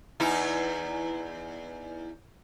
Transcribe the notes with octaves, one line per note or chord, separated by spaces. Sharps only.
E2 D#4 E4